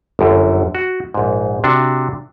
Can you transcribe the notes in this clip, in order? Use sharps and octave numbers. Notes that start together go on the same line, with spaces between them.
G1 F#2
F#4
A#1 G#2
C3 D4 F#4